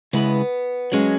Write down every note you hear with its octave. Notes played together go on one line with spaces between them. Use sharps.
C#3 G#3 B3 E4 B4
F#3 G#3 C#4 G#4